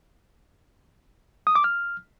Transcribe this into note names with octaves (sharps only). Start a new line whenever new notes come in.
D#6
D6
F6